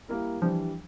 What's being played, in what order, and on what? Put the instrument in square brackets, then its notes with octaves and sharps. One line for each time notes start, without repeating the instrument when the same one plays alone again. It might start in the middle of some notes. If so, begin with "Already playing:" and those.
[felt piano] G3 A#3 E4 A#4
[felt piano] E3 G3 D4 [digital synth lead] F3